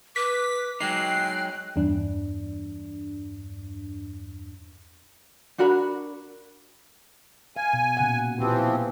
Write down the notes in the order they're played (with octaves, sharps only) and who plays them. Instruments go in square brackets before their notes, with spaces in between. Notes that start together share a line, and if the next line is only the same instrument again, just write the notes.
[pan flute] B4 [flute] D6 [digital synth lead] B6
[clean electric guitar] F#3 G#3 D#4 [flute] G5 [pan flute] F#6 [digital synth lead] C7
[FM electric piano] E2 G2 D4
[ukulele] D4 F#4 A#4 B5
[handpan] F5 [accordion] G#5
[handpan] B2
A#2 C#3 F#5
[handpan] A#2 B3 G4 [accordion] E3 F3 C4